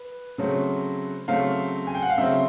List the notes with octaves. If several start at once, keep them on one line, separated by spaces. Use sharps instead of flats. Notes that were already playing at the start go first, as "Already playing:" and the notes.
Already playing: B4
C#3 F#3 A3 C4
C#3 F#3 A3 C4 F5
G#5
G5
F#5
F5
C#3 F#3 A3 C4 E5